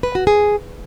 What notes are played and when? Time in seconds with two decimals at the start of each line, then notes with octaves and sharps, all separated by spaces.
0.03 B4
0.15 F#4
0.27 G#4